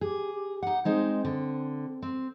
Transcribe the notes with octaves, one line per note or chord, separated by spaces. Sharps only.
G4 G#4
G4
D#4 F#5
G#3 C4 D#4 C5
D3
C4